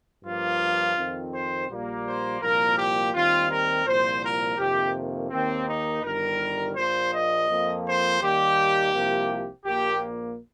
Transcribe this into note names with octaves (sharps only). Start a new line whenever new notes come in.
G2 F3 A#3 F4
F2 D#3 C4
C5
A#1 A#2 G3 A#3
C5
C2 A#2 F3 A#3 A#4
G4
D#2 D#3 G3 C4 F4
A#4
C2 A#2 F3 C5
A#4
F2 C3 D#3 A#3 G4
D#2 D#3 A#3 C4
D#4
G1 G2 D#3 G3 A#4
A#1 A#2 A#3 C5
D#5
F2 F3 A#3
C5
D#2 D#3 G3 A#3 G4
C2 C3 F3 A#3
A#1 A#2 A#3 G4